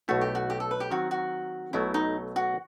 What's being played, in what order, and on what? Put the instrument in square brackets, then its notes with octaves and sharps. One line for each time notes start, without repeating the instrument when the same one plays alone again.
[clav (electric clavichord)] B1 B2 A3 E4 [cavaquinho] F#4
[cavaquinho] G4
F#4
G4
A4
B4
G4
[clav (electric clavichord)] D#3 F#3 C4 [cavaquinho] F#4
[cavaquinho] F#4
[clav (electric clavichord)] B1 B2 F#3 A3 [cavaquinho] E4
[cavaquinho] D#4
F#4